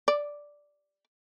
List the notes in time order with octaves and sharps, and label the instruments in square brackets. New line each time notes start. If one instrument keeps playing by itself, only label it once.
[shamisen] D5